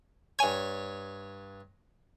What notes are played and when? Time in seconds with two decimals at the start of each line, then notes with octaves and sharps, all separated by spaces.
0.39 G2 C#5 G#5 G#6